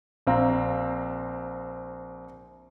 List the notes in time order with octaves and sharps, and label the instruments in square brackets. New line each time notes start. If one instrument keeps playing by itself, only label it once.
[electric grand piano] A#1 C4 F5 A#5